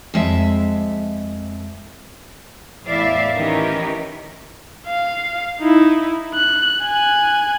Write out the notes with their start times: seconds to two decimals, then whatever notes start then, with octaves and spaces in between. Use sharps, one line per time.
0.14 F2 G#3 E5
2.86 E2 A2 E4 D5 E5 F5
3.35 D#3 E3 C#4 D#4 G4 A#4
4.87 F5
5.60 D#4 E4
6.35 F#6
6.82 G#5 F#6